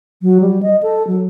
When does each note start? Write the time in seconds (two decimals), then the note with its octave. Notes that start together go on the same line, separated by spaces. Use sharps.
0.22 F#3
0.41 G3
0.63 D#5
0.83 A4
1.07 F#3